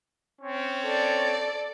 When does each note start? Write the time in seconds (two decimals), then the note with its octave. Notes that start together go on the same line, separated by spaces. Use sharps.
0.41 C4 C#4 C#5
0.84 A4 D5